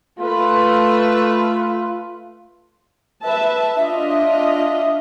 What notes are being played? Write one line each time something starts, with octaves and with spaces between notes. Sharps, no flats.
A3 F4 B4
B4 E5 A5
D4 F4 D#5 E5